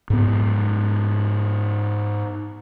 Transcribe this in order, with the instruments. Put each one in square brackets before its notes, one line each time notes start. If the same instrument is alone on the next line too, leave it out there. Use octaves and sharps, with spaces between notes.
[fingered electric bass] G#2 B3